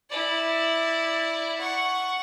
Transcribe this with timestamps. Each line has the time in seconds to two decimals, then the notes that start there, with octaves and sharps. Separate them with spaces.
0.10 E4 D5
1.58 F#5 C#6